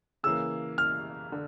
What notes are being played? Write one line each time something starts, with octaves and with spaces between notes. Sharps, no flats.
C#3 E3 A#3 E6
F6
D3